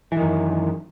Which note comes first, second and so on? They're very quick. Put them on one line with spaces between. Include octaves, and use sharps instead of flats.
E3 D#3 F#2